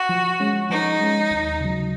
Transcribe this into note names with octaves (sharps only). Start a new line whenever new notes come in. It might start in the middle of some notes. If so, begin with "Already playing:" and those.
Already playing: F#4
F3
G#3 C#4
F3 D#4
G#3 C#4
D#2
C#3 F#3